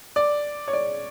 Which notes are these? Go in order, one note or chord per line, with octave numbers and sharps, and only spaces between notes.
D5
C#5
D5